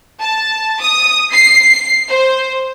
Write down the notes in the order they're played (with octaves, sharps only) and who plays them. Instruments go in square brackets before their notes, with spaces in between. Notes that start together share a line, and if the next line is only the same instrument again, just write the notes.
[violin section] A5
D#6
C7
C5